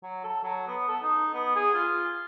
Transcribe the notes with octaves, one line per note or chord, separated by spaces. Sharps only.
F#3
A4
F#3
B3
A4
D#4
B3
G#4
F4